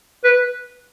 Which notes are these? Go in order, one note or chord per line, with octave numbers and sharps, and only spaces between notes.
B4